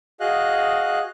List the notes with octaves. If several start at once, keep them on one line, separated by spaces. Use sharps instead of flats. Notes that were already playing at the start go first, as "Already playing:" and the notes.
F#4 G#4 D#5 F5 F#6